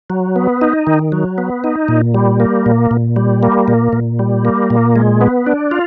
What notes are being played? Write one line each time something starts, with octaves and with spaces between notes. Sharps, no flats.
F#3
B3
D#4
D#3
F#3
B3
D#4
A#2
G3
A#3
A#2
A#2
G3
A#3
A#2
A#2
G3
A#3
A#2
G#3
B3
D4
F4